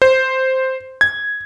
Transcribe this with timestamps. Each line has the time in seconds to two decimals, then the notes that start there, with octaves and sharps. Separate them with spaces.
0.02 C5
1.01 G#6